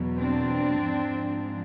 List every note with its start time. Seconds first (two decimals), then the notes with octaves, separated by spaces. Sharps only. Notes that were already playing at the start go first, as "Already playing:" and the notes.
Already playing: E2 B2 F#3
0.18 C4 D4
0.83 G#2 F3